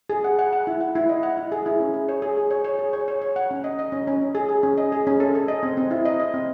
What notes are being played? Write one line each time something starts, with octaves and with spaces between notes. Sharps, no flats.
G#4
F#5
F#5
F#5
E4
F#5
E4
D#5
F#5
E4
G#4
E4
C#4
G#4
C#5
G#4
G#4
C#5
C#5
G#4
C#5
C#5
C#5
F#5
C#4
D#5
D#5
C#4
C#4
C#4
G#4
G#4
C#4
D#5
G#4
C#4
A4
A4
D#5
C4
C4
E4
D#5
D#5
C4